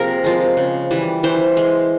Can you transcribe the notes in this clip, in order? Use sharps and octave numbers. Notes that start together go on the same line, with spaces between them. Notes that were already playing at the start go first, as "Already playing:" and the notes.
Already playing: C3 F3 A#3 G#4 A#4
F3 G#3
C#3
E3 G3
E3 C5
G#3